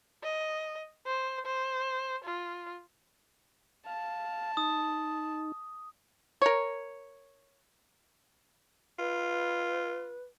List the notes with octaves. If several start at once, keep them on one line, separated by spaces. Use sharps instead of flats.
D#5
C5
C5
F4
F5 A5
D#4 D#6
A#4 C#5
F4 B4